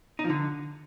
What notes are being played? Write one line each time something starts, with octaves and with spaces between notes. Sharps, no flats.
D#4
F3
D3